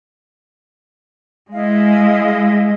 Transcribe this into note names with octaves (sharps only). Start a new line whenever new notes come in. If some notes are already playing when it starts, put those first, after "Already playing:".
G#3 E4 D#5 F5